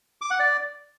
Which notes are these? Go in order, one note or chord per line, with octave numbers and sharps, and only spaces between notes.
D6
F#5
D5